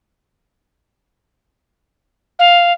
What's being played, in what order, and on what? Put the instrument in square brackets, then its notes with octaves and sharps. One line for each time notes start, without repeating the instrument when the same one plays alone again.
[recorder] F5